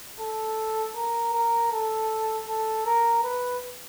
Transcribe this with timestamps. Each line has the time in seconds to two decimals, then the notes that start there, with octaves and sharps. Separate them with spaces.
0.20 A4
0.96 A#4
1.34 A#4
1.72 A4
2.48 A4
2.86 A#4
3.24 B4